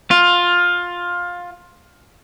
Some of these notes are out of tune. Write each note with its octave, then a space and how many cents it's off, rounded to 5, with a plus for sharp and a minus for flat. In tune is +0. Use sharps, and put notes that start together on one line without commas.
F4 +15